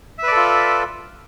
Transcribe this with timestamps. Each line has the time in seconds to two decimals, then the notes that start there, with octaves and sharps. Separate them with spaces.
0.18 E5
0.23 B4
0.27 D5
0.32 A4
0.36 F4